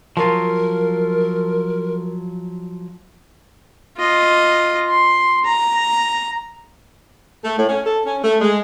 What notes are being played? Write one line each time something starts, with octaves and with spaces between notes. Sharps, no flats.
F3 F#3 F4 A#4
F4 D#5
C6
A#5
A3
A2
C#4
A4
C#4
A3
G#3